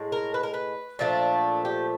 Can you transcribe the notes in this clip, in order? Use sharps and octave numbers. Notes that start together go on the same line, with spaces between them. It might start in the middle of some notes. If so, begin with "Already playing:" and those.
Already playing: A2 G#3
A#4
B4
A#4
B4
A#2 F3 A3 D4
G4